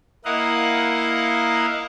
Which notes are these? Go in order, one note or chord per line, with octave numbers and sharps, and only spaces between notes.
A#3 E4 A#4 D#5 F5 F#5